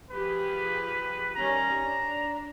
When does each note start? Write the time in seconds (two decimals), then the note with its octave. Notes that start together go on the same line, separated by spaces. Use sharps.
0.11 F3 G4 G#4 B4
1.35 D#3 G3 C#4 A#5
1.83 D4